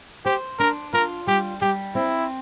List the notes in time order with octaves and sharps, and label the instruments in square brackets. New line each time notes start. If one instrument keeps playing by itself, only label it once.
[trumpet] G4 [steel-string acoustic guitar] C5
[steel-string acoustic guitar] D4 [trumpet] A#4
[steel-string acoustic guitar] F4 [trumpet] A#4
[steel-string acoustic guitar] G3 [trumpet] G4
[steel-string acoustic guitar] G3 [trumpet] G4
[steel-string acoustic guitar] C4 [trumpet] E4